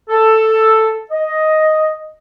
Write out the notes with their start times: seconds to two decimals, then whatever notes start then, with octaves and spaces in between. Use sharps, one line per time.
0.09 A4
1.10 D#5